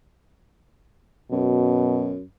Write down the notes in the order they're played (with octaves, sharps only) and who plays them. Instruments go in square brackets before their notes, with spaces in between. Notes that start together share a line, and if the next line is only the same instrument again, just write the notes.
[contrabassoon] F#2 [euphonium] B2